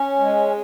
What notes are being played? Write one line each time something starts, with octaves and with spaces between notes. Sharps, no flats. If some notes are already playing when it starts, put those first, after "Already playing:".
Already playing: C#4
G#3